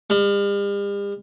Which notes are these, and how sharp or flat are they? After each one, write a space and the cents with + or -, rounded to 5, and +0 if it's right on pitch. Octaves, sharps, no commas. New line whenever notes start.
G3 +45